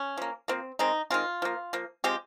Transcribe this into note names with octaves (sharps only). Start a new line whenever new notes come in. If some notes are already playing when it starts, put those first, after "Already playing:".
Already playing: C#4
F3 A#3
F3 A#3 C4
D#3 G#3 C4 D#4
D#3 G#3 C4 F4
F3 A#3
F3 A#3
F3 G#3 C4 G4